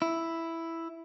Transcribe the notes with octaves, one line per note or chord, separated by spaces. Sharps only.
E4